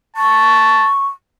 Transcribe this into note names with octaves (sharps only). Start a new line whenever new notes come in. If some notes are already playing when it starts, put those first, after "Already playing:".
A5 C#6